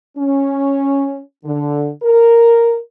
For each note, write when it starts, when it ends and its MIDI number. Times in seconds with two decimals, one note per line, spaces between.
0.17 1.21 61
1.45 1.89 50
2.03 2.76 70